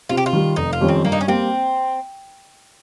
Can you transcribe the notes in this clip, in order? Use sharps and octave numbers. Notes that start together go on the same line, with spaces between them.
C3 F4
G4
F4
D#3 G3
F1 D#4
F4
F2 D#3 G3 C#4
C4
G2 A#3
D#4
C#4
G3 A#3 C4